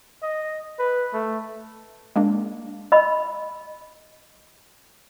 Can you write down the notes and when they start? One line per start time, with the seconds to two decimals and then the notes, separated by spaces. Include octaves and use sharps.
0.23 D#5
0.79 B4
1.13 A3
2.16 G#3 A#3 D4
2.92 D#5 B5